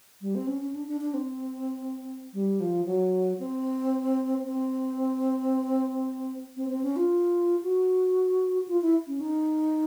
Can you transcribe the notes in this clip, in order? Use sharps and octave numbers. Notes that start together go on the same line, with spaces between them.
G3
C4
C#4
C#4
D4
D4
D4
C4
G3
F3
F#3
C4
C4
C4
C4
C#4
F4
F#4
F4
E4
C#4
D#4